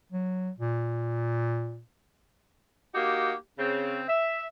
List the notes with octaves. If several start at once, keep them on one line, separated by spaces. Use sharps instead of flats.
F#3
A#2
A#3 D#4 F#4 G4
C#3 C4
E5